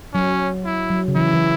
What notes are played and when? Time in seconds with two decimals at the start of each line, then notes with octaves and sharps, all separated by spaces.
0.14 F#3 C#4
0.65 E4
0.90 F#3
1.08 C#3
1.16 E3 E4
1.34 E3